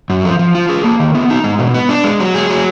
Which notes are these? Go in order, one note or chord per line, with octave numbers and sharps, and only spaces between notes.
F#2
F3
F3
F4
G#4
A#3
D#3
B3
D#4
G#3
B2
B3
D4
G#3
F#3
G#4
F#3